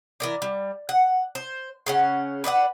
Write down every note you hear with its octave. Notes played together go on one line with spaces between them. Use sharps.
E3 A#4 D5
G3
F#5
C5
C#3 C#4 F#5
B4 D5 D#5 F#5